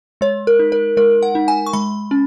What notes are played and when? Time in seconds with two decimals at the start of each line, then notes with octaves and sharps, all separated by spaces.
0.21 G#3 C#5
0.47 A#4
0.59 D#4
0.72 A#4
0.97 G#3 A#4
1.23 F#5
1.35 D#4
1.48 G#5
1.66 C#6
1.73 G#3 B5
2.11 C#4